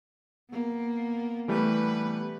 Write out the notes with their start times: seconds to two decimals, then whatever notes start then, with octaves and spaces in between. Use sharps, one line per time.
0.50 A#3 B3
1.48 E3 G3 A3 B3 B4